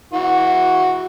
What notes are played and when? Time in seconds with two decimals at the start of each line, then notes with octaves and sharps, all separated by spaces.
0.13 E3 F#4